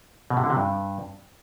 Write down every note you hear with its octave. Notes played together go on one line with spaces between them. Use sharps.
B2
C3
D3
C3
G2